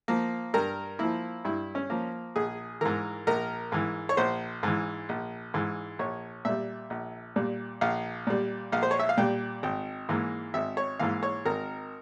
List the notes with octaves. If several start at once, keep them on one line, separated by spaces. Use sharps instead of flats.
F3 A#3
G2 A#4
F3 A#3 E4
G2 E4
C#4
F3 A#3
A#1 G#4
G#2 E3 A#4
A#1 A#4
G#2 E3
C#5
A#1 C5
G#2 E3
A#1
G#2 E3
A#1 C#5
A#2 G3 E5
A#1
A#2 G3
A#1 F5
A#2 G3
A#1 F5
C5
C#5
E5
F5
A#2 G3 G5
G#1 G5
G#2 E3 A#3
G#1 E5
C#5
G#2 E3 A#3 F5
C#5
G#1 A#4